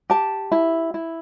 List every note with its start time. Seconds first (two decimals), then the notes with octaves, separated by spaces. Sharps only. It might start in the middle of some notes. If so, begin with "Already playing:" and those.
0.10 G4 A5
0.52 E4
0.94 E4